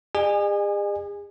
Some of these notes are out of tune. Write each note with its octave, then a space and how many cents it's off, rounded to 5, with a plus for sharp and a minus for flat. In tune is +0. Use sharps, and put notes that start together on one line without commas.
G#4 -40 D#5 -45 G#5 -15